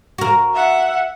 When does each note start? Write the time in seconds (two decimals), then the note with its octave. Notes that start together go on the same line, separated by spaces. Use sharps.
0.18 F#4 A#4
0.54 E5 F#5